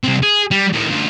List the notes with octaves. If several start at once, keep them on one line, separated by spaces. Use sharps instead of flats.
C2 C4
G#4
G3
A2 D#3
D2 F4